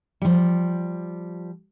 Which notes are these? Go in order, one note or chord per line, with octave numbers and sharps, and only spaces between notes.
F3 G3